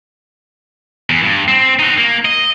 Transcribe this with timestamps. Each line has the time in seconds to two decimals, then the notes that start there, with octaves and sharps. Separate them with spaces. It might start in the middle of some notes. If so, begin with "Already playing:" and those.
1.10 E2
1.23 G2
1.48 C4
1.79 D#4 F#4
1.98 A#3
2.25 D#5